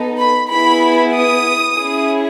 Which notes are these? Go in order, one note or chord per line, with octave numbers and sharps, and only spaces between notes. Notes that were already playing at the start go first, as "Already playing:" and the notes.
Already playing: B3 D#4 A4
B5
B3 E4 G#4 B5
D#6
C#4 E4 G#4